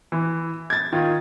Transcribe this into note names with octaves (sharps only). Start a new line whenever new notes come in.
E3
G#6 A6
D#3 F4